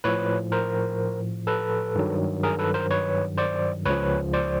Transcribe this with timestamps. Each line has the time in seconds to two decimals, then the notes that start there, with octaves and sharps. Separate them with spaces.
0.04 A2 F3 B4 C#5
0.52 A#4 C5
1.47 A4 B4
1.95 G2 D#3 F#3
2.43 G#4 A#4
2.59 A4 B4
2.74 A#4 C5
2.91 B4 C#5
3.38 C5 D5
3.86 C#2 C#3 F3 B4 C#5
4.33 C5 D5